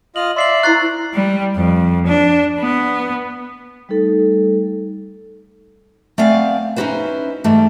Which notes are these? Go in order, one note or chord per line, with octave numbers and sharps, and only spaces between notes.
F4 D#5 F6 F#7
D5 E5 C6 C7 F#7
E4 C5 A#5 C#6 F#6 A6 C7
G3
F2
D4
B3
G3 A3 D#4 A4
A3 B3 C4 D5 F5 G#5
C#4 D#4 E4 F#4 B4 C5
G#2 E3 G3 A3